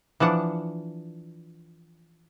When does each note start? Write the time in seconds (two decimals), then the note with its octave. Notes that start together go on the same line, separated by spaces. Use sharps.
0.20 E3 F3 D4 F#5